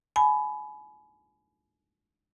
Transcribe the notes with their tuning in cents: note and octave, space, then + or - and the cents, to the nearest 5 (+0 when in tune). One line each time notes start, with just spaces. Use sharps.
G#5 +35 B5 +10